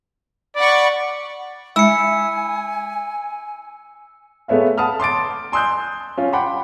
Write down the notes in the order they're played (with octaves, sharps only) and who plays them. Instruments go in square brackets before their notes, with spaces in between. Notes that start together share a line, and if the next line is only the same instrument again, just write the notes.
[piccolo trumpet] D5 [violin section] F#5 B5 C#6
[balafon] G#3 [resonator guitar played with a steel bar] E4 [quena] G#5 [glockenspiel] E6 C#7
[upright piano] G#3 A3 B3 C#5 E5 F5
F#5 A5 B5 D#6 F6
C6 D6 A6 D7
G#5 C6 D#6 E6 F#6 G6
C#4 F4
F#5 G5 B5 C6 D6